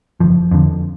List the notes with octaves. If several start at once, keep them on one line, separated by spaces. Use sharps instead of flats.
F#1 F3
F2 D3